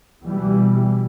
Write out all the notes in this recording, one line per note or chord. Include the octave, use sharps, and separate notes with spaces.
B2 E3 G3